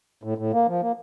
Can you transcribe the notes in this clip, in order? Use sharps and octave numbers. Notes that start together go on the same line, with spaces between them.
A2
A2
A#3
F3
A#3